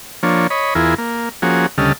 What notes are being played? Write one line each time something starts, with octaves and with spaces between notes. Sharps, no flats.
F3 A#3 D4 C#5
C#5 D#5 B5
E2 E4 F4 G#4 A#4
A#3
F3 A#3 C#4 F#4 G#4
D2 C#3 G3 A4 D#5 F6